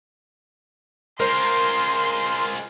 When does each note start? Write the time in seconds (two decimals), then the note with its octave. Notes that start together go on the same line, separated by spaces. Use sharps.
1.20 G#3 F4 A#4 C5 C6